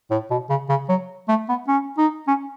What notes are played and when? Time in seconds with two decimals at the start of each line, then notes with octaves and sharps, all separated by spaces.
0.11 A2
0.30 B2
0.50 C#3
0.69 C#3
0.89 F#3
1.29 A3
1.49 B3
1.68 C#4
1.98 D#4
2.28 C#4